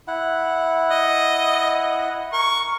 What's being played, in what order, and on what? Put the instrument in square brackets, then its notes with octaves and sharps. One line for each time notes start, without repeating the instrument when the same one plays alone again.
[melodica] E4 F#5
[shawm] D#5
[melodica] A#4 [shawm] C#6